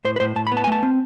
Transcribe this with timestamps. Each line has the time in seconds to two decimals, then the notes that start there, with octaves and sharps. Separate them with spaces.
0.05 A2 C5
0.16 B4
0.20 A2 C5
0.36 A2 A5
0.47 B5
0.52 B3
0.57 A5
0.64 G#5
0.67 A3 A5
0.83 C4